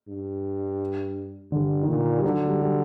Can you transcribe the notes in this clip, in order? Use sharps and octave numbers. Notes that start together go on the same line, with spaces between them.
G2
G2 D3
D#3
A#2 D3
G3
D3 F#3
G3
G3